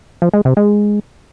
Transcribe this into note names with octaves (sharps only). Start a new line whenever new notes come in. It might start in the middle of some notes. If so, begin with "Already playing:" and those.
F3
G#3
C3
G#3